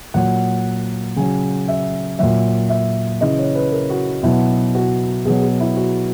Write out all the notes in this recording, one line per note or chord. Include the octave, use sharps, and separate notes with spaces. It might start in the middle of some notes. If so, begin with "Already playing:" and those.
A#2 F#3 F#5
C#3 F#3 G#5
E5
A#2 F#3 E5
E5
C#3 E3 D#5
C#5
B4
A#4
F#4
B2 F#3 E4
F#4
B2 F#3 G#4
G#4
E4
F#4